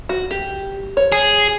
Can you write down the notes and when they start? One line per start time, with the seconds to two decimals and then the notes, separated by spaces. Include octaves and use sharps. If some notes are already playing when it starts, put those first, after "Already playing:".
0.09 F#4
0.31 G4
0.97 C#5
1.12 G#4